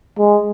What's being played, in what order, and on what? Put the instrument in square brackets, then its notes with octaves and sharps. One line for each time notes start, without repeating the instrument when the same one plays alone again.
[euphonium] G#3